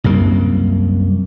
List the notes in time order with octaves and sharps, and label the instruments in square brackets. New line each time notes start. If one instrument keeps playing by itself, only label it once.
[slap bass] C2 F#2 A#3